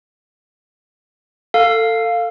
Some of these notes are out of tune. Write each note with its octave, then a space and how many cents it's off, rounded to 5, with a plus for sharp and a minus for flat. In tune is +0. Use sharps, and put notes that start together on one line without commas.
A4 +25 F5 +0